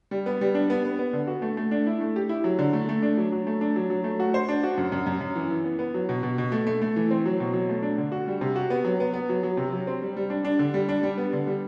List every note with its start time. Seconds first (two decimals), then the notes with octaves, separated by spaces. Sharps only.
0.11 G3
0.26 B3
0.41 G3
0.55 D4
0.70 B3
0.85 B3
0.99 B3
1.13 D3
1.27 F#4
1.42 A3
1.57 A3
1.71 D4
1.87 E4
2.01 A3
2.16 G4
2.29 E4
2.44 F#3
2.59 D3
2.73 A3
2.89 A3
3.02 D4
3.17 F#3
3.32 F#3
3.47 A3
3.61 D4
3.76 F#3
3.90 F#3
4.04 A3
4.20 F#4
4.34 C5
4.49 D4
4.63 F#4
4.78 F#2
4.92 F#2
5.06 F#2
5.21 F#2
5.36 E3
5.50 E3
5.64 B3
5.79 B3
5.94 F#3
6.09 B2
6.23 B2
6.38 B2
6.52 A3
6.67 A3
6.82 A3
6.96 E3
7.11 C4
7.25 F#3
7.40 B2
7.53 F#3
7.69 A3
7.83 D4
7.98 D3
8.12 F#4
8.27 G3
8.41 C3
8.56 F#4
8.70 B3
8.84 F#3
9.00 B3
9.14 B3
9.29 F#3
9.43 F#3
9.57 C3
9.73 F#3
9.87 C4
10.02 G3
10.17 G3
10.30 D4
10.45 D4
10.59 D3
10.74 G3
10.89 D4
11.03 G3
11.18 B3
11.33 D3
11.47 G3